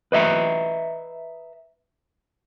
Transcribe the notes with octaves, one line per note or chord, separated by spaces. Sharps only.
B4 D#5 E5 A#5